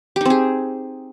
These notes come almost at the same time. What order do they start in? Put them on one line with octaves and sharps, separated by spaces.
G4 D#4 C4 G#4